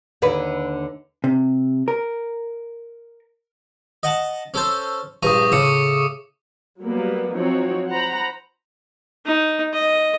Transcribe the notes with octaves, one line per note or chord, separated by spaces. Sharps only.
D#2 D3 B4
C3
A#4
D#5 F#5 A5
C#4 A4 C5
A#1 G2 A#5 C#6 D#6
A2 C#3 D6 D#6 C#7
F#3 G3 A#3 B3
F3 F#3 C4 D#4 F#4 C#5
C5 F#5 A#5 B5
D#4
D#5